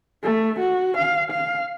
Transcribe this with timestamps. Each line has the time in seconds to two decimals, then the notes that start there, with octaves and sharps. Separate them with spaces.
0.23 A3
0.60 F#4
0.97 F5
1.31 F5